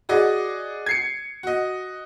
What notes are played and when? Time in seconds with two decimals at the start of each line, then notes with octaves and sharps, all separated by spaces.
0.09 F#4 G#4 D5 D#5
0.86 G#6 C7 C#7
1.43 F#4 D#5